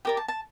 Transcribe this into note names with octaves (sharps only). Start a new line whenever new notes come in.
G4 A#4 D5 G5
A5
A5